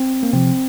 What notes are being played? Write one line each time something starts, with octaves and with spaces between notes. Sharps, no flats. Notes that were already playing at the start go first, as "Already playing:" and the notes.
Already playing: C4
A#3
C3 F3 C4